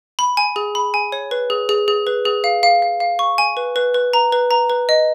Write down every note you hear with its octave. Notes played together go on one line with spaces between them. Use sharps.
B5
G#5
G#4
B5
G#5
C#5
B4
G#4
G#4
G#4
B4
G#4
F5
F5
F5
F5
C#6
G#5
B4
B4
B4
A#5
B4
A#5
B4
D#5